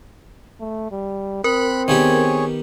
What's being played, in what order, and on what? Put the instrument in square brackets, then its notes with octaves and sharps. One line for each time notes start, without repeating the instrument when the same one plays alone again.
[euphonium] A3
G3
[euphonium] C4 [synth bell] A#4 [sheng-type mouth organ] B5 F#6
[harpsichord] D#3 B3 G4 [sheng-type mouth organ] G#4 C#5